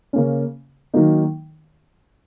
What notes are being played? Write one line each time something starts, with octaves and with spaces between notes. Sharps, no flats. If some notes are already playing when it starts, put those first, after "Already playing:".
C#3 A#3 C#4
D#3 F#3 A#3 D#4